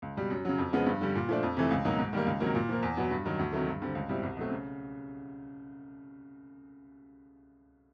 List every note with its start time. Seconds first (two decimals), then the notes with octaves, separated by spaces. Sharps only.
0.02 C#2
0.17 B2 G3
0.30 F#2
0.45 C#3 F#3
0.58 F2
0.73 C#3 F3 G#3 B3
0.86 G2
1.01 D3 G3
1.15 A#2
1.29 F3 A3 D4
1.43 F2
1.57 C3 E3 A3
1.71 C#2
1.85 B2 F#3 A#3 D#4
1.99 G#2
2.13 D#3 G3 A#3
2.26 C#2
2.40 C3 D#3 F#3 A#3
2.55 A#2
2.69 F3 A#3
2.83 E2
2.97 B2 F#3 B3
3.11 G2
3.26 D#3 F#3
3.39 D2
3.53 C3 D#3 F#3 A3
3.67 G2
3.82 D3 G3 C4
3.95 C#2
4.09 B2 G3 C4 E4
4.23 C2
4.37 B2 F#3 A3 C4
4.51 C#3